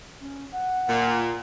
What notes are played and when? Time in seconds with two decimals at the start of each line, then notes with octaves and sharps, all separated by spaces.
0.20 C#4
0.52 F#5
0.88 A#2